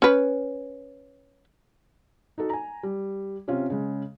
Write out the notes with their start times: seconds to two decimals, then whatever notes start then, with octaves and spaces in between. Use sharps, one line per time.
0.02 C#4 B4
2.38 D#4 F#4 A4
2.50 G#5 A#5
2.83 G3
3.48 C3 C#4 F4
3.70 C#3 G#3